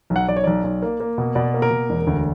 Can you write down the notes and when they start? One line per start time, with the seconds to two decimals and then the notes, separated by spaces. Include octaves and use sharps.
0.10 B1
0.16 F#5
0.28 B1 D5
0.36 C#5
0.44 B1 D5
0.64 B1
0.82 A#3
1.00 A#3
1.18 B2
1.35 B2 D5
1.54 A#3
1.62 A#4
1.71 B2
1.90 E1
2.07 D2